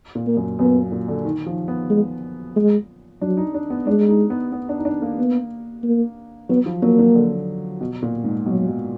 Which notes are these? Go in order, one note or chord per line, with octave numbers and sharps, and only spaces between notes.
A#2
A#3
F#2
F#2 B3
A#2
D3
D#3
F3
B3
G#3
G#3
F#3 D4
D#4
D4
B3
G#3 D4
D#4
B3
B3
D4
D#4
D4
A#3
B3
A#3
F#3 B3
F3
F#3 A#3
F#3
D3
B2
A#2
G#2
B2 F#3
B2